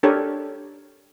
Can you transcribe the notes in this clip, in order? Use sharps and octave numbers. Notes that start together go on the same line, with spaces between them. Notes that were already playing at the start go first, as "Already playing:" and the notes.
D4 G4 A4 A#4 C#5